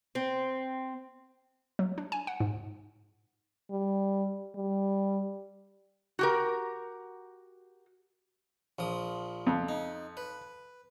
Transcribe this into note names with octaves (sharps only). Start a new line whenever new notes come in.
C4
F#3
D4
G#5
F#5
G#2
G3
G3
F#4 G4 A#4
A#1 F3 D#6
F2
D#4
B4